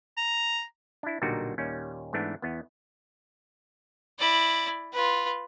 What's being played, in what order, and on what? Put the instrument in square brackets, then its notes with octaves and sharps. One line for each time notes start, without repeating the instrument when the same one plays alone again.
[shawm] A#5
[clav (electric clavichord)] D4 E4
B1 A#2 D3 G3 D#4 F#4
D#2 A#2 G3 C#4
G#2 E3 A3 B3 D4
E2 B3
[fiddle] E4 D5
F4 B4